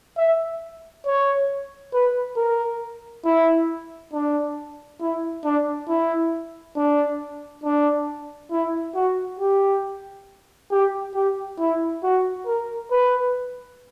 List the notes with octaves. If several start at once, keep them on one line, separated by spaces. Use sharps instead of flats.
E5
C#5
B4
A#4
E4
D4
E4
D4
E4
D4
D4
E4
F#4
G4
G4
G4
E4
F#4
A#4
B4